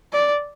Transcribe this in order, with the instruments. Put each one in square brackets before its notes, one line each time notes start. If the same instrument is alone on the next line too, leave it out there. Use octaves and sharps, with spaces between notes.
[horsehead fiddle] D5